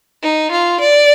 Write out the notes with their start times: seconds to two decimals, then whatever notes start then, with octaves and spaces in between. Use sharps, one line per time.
0.23 D#4
0.52 F4
0.81 D5